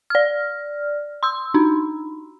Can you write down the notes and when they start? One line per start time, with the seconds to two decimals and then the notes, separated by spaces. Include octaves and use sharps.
0.10 D5 F6
1.23 C6 E6
1.54 D4 D#4